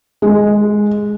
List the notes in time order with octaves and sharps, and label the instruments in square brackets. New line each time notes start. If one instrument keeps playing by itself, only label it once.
[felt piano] G#3